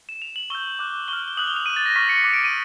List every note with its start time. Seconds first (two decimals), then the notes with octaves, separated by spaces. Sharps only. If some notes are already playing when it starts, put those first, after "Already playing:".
0.09 E7
0.22 F7
0.36 F#7
0.50 C#6 E6 G6 G7
0.79 D6 F#6
1.08 C#6 F6 G7
1.28 G7
1.37 D#6 F#6 F#7
1.47 G7
1.56 F7
1.66 D6 G6 D#7
1.76 A6
1.86 A#6
1.96 C#6 F6 B6
2.09 C#7
2.24 D6 F#6
2.33 D7
2.44 D#7